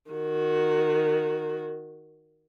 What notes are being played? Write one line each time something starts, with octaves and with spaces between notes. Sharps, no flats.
D#3 F#4